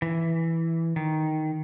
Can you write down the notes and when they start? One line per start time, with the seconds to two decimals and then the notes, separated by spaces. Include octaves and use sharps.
0.02 E3
0.96 D#3